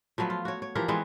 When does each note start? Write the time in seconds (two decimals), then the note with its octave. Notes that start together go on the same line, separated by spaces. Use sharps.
0.18 F3 F#3 A3 B3
0.30 F4
0.45 F#4 C#5
0.62 C#5
0.75 E3 F3 G4 A#4
0.88 E3 G#3 B3 C4